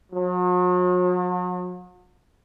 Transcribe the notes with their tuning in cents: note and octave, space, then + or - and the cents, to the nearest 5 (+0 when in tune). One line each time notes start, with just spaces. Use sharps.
F#3 -45